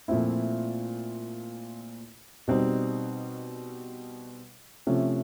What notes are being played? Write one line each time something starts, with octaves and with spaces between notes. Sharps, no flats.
A#2 F3 A3 C4 E4
B2 G3 C4 D#4
C3 F3 A3 C#4